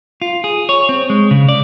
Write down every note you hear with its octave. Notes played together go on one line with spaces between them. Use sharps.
F4
G#4
C#5
C4
G#3
C#3
D5